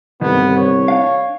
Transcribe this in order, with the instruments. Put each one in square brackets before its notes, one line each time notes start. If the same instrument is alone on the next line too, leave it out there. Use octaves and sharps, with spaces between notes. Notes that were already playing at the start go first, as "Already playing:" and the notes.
[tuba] C2 [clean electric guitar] G2 D3 D#3 [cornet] B3
[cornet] C#5
[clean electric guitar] D4 F5